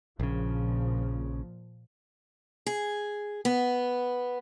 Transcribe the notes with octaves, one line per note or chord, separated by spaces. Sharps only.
A#1 A#2 C#3 F3
G#4
B3